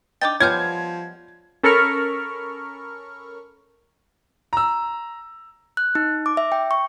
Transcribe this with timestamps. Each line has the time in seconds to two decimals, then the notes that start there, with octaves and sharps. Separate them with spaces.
0.22 D4 D#4 G5 D6 A6
0.40 F3 G3 G#3 B3 C#5 F6 G6 G#6
1.63 C#4 A4 A#4 B5 C#6 F6
4.53 A#5 E6
5.77 F#6
5.95 D#4
6.26 D6
6.37 E5
6.52 G5
6.71 C#6